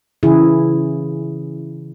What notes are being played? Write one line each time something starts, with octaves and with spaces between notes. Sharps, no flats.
C#3 E3 E4 G#4